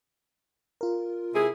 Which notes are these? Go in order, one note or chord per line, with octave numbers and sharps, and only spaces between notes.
F4 A#4
C3 E4 G#4